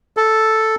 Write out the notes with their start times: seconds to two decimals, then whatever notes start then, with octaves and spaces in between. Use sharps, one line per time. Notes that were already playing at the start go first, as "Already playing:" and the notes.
0.17 A4